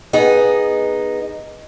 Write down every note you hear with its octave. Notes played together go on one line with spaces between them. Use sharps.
B3 D#4 G#4